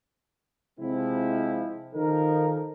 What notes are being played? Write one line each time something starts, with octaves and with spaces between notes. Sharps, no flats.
C3 F3 G#3 C4 E4
D#3 F3 D#4 A4 A#4